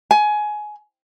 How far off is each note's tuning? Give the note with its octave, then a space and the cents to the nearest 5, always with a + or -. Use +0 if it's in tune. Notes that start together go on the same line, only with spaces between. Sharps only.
G#5 +20